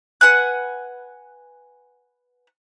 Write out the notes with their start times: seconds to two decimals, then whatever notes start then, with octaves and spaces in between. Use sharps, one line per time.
0.21 B4 F#5 G#5 F#6